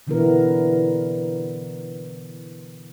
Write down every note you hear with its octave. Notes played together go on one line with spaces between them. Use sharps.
B2 D3 E3 B3 E4 A#4